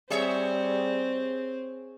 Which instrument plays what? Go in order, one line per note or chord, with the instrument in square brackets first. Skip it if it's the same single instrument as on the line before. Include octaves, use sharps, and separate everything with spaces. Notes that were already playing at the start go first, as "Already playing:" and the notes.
[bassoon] G3 [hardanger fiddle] C4 [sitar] G#4 C#5 E5